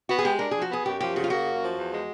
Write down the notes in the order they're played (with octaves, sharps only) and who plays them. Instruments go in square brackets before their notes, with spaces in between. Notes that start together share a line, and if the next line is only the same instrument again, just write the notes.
[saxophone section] B3 [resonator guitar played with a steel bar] F#4
[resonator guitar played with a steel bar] G#4
[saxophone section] G#3 [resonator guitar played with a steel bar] G4
[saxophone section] D4 [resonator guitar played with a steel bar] A#4
[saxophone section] F3 [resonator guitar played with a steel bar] G#4
[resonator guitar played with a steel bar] F#4
[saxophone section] B3 [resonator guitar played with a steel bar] G#4
[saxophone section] F#2 [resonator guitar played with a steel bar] G4
[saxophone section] F3 [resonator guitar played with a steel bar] G4
[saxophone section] C#3 [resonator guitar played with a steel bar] F#4
[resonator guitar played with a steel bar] F4
[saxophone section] A#3 [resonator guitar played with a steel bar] F#4
[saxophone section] F#2
F3
E2
G#3